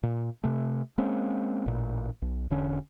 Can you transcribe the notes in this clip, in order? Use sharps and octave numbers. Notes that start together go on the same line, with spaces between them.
A#2
C3 A3
G#3 A#3 C4 C#4
A1 A#2
B1
E1 D3 C#4